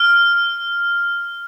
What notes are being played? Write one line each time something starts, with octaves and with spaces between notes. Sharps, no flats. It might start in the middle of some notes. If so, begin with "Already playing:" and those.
Already playing: F6